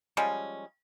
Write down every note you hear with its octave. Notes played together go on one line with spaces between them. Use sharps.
F3 G3 G#3 C#4